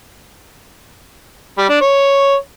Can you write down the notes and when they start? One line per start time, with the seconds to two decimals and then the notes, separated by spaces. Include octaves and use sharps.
1.58 G3
1.70 D4
1.81 C#5